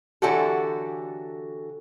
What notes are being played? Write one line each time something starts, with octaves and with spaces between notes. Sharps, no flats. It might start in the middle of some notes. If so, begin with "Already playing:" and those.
D3 E3 F#3 F#4 G4 A4